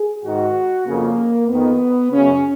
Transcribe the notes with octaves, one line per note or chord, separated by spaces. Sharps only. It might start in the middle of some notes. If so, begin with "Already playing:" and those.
Already playing: G#4
G#2 D#3 F#4
F2 C#3 A#3
F2 D#3 B3
F#2 C#3 C#4